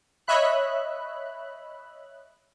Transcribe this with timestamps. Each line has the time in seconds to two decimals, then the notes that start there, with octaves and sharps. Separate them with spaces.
0.27 C#5 D#5 E5 B5 F#6